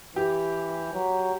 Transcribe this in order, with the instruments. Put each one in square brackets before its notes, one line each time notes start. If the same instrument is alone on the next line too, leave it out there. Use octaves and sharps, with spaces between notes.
[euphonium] E3 [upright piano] G4
[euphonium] F#3